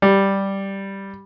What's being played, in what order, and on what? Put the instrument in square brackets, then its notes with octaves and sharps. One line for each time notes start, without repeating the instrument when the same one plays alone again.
[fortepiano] G3